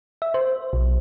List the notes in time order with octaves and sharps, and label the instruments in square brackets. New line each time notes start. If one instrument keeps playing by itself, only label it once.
[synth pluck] E5
C5
B1